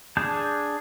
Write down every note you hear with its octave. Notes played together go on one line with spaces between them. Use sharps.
D4 G#4 A5 G6